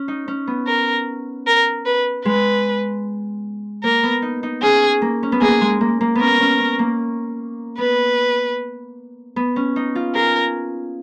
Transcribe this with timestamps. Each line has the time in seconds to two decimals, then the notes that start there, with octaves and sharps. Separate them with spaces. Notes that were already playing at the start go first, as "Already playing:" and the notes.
Already playing: C#4
0.08 D#4
0.28 C#4
0.47 B3
0.67 A#4
1.47 A#4
1.86 B4
2.25 G#3 B4
3.83 A#3 A#4
4.03 B3
4.22 D#4
4.43 D#4
4.62 C#4 G#4
5.02 A#3
5.23 C#4
5.32 B3
5.41 A#3 G#4
5.61 G#3
5.81 A#3
6.01 A#3
6.15 B3 C#4 A#4
6.40 C#4
6.60 C#4
6.79 A#3
7.78 B3 B4
9.36 B3
9.56 C#4
9.76 D#4
9.95 F4
10.15 G#4 A#4